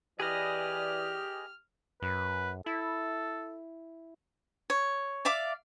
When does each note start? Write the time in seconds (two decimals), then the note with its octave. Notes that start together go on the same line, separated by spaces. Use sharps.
0.20 E3 G4 G#4 B4 D5 D#5 F6
2.02 F#2 B4
2.66 E4 A4
4.70 C#5
5.25 D5 E5 F5 D6